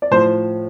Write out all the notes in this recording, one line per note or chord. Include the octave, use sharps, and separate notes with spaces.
D5
A2 F3 C5